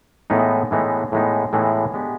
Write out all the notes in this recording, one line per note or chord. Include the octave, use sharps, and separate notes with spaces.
A2 E3 G#3 B3 D#4
A2 E3 G#3 B3 D#4
A2 E3 G#3 B3 D#4
A2 E3 G#3 B3 D#4
G#3 B3 D4 G4